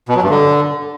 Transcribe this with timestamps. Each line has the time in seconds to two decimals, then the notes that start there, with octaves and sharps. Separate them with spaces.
0.09 B2
0.16 F#3
0.23 G2
0.30 D3